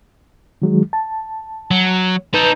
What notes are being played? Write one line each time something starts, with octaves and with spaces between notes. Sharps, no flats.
D#3 F#3 G#3
A5
F#3
D#4 A4 B4 G6